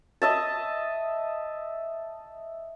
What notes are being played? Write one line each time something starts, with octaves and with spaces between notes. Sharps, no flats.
D#5 E5 A5